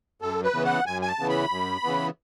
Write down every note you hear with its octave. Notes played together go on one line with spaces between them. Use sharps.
F#2 A4
B4
C#3 E3 B3
F#5
F#2 G#5
G#5
A5
C#3 E3 B3
B5
F#2
C#3 E3 B3